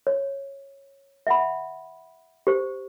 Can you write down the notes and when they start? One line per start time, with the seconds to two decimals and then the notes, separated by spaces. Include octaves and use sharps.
0.07 C#5
1.27 E5 F#5 B5
2.47 G4 C5